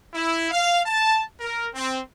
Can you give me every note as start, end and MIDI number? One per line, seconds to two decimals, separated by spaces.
0.14 0.47 64
0.51 0.80 77
0.85 1.20 81
1.40 1.66 70
1.75 1.97 60